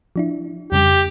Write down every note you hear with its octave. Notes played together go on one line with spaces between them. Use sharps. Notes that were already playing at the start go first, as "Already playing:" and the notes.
F3 D4 E4
F2 C#3 G3 G4